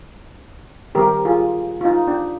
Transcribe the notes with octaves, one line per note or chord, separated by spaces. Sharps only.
D#3 G3 C4 G4 A#4
F4 G#4
F4
D#4
D4